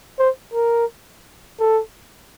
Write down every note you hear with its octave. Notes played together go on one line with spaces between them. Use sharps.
C5
A#4
A4